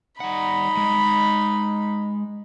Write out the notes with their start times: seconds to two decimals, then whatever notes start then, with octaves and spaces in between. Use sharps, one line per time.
0.20 G3 D#4 F#5 B5
0.77 G#3